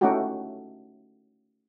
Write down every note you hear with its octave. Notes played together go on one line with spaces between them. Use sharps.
A3 C#4 D#4 E4 F#4 G4